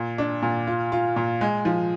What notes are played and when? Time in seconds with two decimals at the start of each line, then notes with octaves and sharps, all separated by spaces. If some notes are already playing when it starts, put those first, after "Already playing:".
Already playing: A#2
0.18 D4
0.42 A#2
0.67 F4
0.92 F4
1.16 A#2
1.41 G#3
1.65 F3